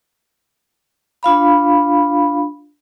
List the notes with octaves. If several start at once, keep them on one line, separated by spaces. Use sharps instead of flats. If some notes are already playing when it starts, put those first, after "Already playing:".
D4 F4 F5 B5